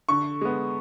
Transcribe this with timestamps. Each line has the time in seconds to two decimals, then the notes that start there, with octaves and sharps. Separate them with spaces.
0.09 D3 C#6
0.41 G#3 B3